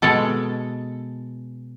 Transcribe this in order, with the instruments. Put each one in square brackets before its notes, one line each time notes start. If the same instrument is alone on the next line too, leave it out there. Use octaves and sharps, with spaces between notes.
[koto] B2 G#3 A4